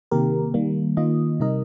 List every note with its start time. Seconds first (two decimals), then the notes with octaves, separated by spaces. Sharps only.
0.11 C3 D#3 A#3 G4 A#4
0.54 D#3 G3 A#3
0.97 D#3 A#3 F4 D#5
1.40 C3 G3 D#4 A#4 D#5